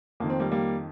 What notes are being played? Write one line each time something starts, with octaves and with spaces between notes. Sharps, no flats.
F2 D#3 A#3
C4
G3 A#3
G3 A#3